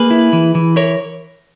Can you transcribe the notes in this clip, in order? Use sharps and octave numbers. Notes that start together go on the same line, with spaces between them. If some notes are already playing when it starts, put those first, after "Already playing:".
Already playing: A#3 G#4 B4
E4
E3
E3
E4 A#4 C#5